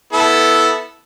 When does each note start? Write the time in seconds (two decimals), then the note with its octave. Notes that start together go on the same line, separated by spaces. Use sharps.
0.13 B3 E4 A4